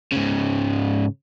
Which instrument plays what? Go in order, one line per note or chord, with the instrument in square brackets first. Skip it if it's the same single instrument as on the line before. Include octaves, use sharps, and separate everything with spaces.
[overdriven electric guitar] G#2 C#3